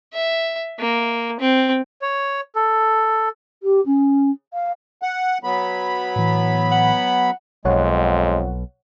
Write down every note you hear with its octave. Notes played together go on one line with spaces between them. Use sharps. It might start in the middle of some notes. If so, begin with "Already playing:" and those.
E5
A#3
C4
C#5
A4
G4
C#4
F5
F#5
F#3 B3 B5
A2 E3
F#5
B1 F2 G#3 C#5 F#5